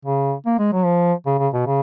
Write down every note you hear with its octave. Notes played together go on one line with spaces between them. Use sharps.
C#3
A#3
G#3
F#3
F3
C#3
C#3
B2
C#3